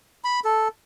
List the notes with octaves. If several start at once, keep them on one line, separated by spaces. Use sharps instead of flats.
B5
A4